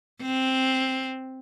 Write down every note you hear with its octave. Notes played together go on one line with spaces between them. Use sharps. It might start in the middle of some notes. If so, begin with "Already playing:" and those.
C4